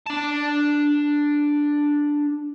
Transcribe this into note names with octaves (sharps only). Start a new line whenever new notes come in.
D4 A5